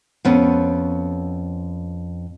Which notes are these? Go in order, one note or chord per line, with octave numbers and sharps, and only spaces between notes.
F2 B3 C#4